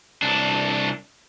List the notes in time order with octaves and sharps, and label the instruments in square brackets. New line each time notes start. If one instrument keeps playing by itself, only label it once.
[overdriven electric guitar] C2 D4